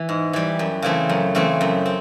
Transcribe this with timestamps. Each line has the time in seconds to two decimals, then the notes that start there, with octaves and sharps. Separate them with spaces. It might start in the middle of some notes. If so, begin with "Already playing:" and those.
Already playing: E3
0.09 G#2
0.33 E3 G3
0.59 F#2
0.82 C#3 E3 A3 C4
1.09 F#2
1.35 C#3 E3 A3 C4
1.61 F#2
1.86 C4